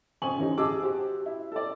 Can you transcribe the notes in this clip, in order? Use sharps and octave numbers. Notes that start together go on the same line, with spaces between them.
F2 C#3 C5 G#5 C#6 F#7
D3 E3 C#4 D#4 G4
G4 G#4 D#5 A5 D6 E6
F#4 G4 C5
E4
A4 D5